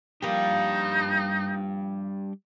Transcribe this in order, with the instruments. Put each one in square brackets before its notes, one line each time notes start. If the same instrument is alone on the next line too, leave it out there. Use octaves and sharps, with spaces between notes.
[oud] F3 A#3 [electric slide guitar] G3 D4 G4 [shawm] D#4